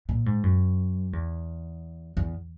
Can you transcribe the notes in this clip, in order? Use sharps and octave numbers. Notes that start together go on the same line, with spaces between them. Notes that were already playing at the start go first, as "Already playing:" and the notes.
A#2
G#2
F#2
E2
E2